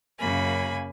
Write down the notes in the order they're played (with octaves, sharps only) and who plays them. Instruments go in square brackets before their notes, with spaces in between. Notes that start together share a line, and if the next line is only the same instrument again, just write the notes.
[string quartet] F#2 C#3 A#3 G#5 B5